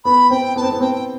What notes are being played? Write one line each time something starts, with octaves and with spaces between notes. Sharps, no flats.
B3 B5
C4 G5
B3 A5
C4
B3
C4 G5